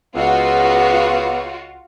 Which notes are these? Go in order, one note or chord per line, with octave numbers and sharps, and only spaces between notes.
C#2 B3 F4 F#4